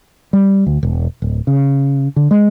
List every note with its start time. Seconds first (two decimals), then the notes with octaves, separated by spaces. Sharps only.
0.33 G3
0.67 D2
0.83 E1
1.22 D1
1.47 C#3
2.16 D3
2.31 G#3